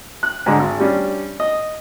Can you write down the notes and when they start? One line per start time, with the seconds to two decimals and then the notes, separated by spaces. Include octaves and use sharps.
0.23 F#6
0.46 G#2 D3 G#3
0.59 G#1
0.80 G3 C#4 D4
1.40 D#5